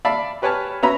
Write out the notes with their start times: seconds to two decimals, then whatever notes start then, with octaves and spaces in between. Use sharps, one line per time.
0.05 D5 E5 F5 A5 B5
0.42 G4 B4 C#5 G#5 A5 F6
0.83 B3 C#4 F#4 E5 A#5 B5